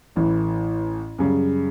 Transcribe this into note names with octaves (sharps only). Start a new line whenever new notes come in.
A1 A2 E3
F#2 C#3 G3